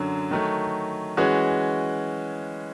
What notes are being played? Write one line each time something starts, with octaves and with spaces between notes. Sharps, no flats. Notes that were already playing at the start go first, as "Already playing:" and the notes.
Already playing: F#2 D3 F#3
D#3 F#3 A3
E3 G#3 C#4 F#4